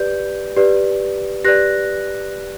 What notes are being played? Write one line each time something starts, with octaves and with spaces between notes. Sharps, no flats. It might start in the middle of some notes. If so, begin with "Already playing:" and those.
Already playing: G4 B4 D5 G6
G4 B4 D5
G4 B4 D5 F#6 A#6